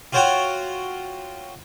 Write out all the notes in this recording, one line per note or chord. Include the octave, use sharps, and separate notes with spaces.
F4 F#4 C5 C#5 F#5 G5